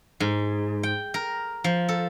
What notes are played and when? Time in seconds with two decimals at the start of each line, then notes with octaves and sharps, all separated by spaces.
0.20 G#2
0.83 G5
1.14 A#4
1.64 F3
1.89 A4